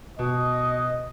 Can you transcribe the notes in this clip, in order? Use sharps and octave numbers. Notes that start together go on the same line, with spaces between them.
B2 D#5